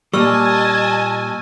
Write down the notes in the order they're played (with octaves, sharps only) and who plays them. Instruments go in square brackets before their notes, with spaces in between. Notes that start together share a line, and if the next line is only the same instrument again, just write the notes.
[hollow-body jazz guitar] A#2 G3 [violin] D#5 A5 [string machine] G#5 [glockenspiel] C#6 E6 F6